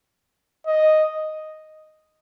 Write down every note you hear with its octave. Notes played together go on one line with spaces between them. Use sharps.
D#5